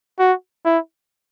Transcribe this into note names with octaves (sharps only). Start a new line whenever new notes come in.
F#4
E4